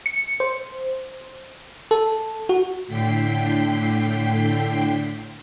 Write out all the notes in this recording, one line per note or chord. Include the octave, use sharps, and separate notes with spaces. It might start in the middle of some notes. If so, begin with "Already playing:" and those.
C#7
C5
A4
F#4
A2 D3 G5 B6 C7